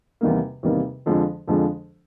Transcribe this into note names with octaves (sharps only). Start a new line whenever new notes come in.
E2 C3 D#3 G3 A#3
E2 C3 D#3 G3 A#3
F2 D3 F3 G#3
F2 D3 F3 G#3